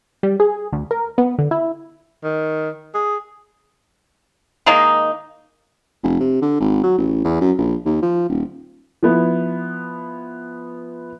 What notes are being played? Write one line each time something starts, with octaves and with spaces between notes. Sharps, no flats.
G3
G#4
D2
A#4
B3
D3
E4
D#3
G#4
D#3 G#3 A#3 D#4
F1
C3
D3
G#1
F#3
A1
E2
F#2
A#1
D#2
F3
D#1
F3 B3 E4